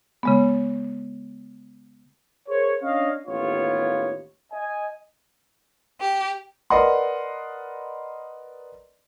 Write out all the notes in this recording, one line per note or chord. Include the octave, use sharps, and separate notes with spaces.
C#3 G#3 B3
G#4 A#4 C5 C#5
C#4 D4 C#5 D#5 F5
A1 D#2 B3 F4 C#5
D#5 G#5
G4
A#4 B4 D5 D#5 F#5 C6